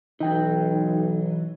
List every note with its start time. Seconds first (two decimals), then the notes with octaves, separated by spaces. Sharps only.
0.20 B1 E3 F#3 D#4 G5